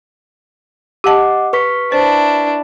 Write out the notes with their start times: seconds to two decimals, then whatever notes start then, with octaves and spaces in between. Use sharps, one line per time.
1.04 G4 D#5 F#5 A5 D6
1.53 B4 C#6 B6
1.92 D4 E4 C5